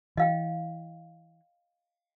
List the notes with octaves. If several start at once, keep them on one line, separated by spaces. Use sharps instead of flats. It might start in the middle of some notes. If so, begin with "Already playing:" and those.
E3 D#5 F5 G5